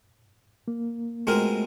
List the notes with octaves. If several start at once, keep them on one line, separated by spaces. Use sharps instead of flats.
A#3
B2 G#3 A3 C4 F4 A#4